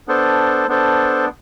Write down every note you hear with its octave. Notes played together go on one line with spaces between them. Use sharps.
B3 D4 A4 C5
B3 D4 A4 C5